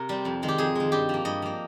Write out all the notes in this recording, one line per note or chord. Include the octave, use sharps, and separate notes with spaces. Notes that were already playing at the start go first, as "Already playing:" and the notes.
Already playing: C3 A#4
G3 C4
F2
D#3 G#3
G4
F2 G#4
D#3 G#3
G2 G4
F3 A#3
G2 D#5
F3 A#3